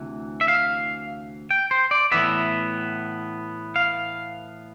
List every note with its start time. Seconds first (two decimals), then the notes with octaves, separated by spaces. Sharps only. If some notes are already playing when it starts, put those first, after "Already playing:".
Already playing: D2 C3 E3
0.41 E5
0.48 F5
1.51 G5
1.71 C5
1.91 D5
2.12 A2 E3 B3 E5
3.76 F5